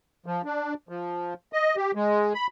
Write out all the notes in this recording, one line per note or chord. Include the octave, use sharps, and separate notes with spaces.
F3
D4
F3
D#5
G4
G#3
B5